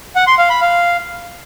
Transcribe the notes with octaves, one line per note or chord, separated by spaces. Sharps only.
F#5
C6
F5
B5
F5